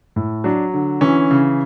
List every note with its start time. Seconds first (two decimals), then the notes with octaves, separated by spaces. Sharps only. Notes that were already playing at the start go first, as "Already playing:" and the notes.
0.16 A2
0.44 F#3 D4
0.74 D3
1.01 E3 C#4
1.31 C#3